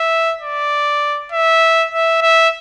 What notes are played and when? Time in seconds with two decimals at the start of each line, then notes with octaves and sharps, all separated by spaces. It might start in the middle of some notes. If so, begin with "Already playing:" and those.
Already playing: E5
0.41 D5
1.32 E5
1.91 E5
2.22 E5